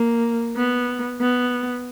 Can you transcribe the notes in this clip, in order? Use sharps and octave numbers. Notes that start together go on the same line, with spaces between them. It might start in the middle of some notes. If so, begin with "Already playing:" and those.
Already playing: A#3
B3
B3